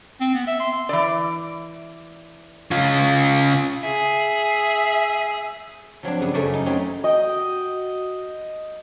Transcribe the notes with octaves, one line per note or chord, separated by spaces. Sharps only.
C4
B3
E5
C6
E3 D5
C#3 F4
G#4 E5
F3 F#3 C4 D4
G2 C#3
F#2 C#3 A3 A#4 D5
D#4
F#3 C4 C#4 D#4 G4
F#4 D#5 G5